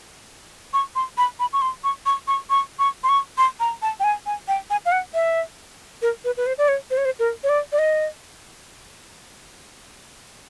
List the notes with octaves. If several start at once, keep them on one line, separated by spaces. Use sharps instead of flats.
C#6
C6
B5
B5
C#6
C6
C#6
C#6
C#6
C#6
C#6
C6
C#6
C6
A#5
A5
G5
G#5
G#5
G5
G#5
F5
F#5
E5
A#4
B4
B4
C5
D5
C#5
C5
C#5
C5
A#4
C#5
D5
D5
D#5